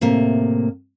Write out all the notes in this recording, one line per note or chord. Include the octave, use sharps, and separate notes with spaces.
A2 C3 A#3